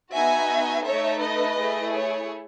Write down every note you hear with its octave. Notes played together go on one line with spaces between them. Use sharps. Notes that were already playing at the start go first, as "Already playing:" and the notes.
B3 D#4 F#4 E5 G#5
A3 D#4 A4 C#5 E5
B4 D#5
A3 E4 G#4
C#5